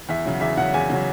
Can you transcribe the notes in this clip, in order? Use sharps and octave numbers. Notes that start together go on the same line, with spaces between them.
E2 E5
C#3 F#3
E2 E5
C#3 F#3 F#5
E2 G#5
C#3 F#3